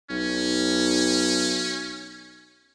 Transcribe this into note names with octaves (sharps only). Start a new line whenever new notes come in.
B1 C#4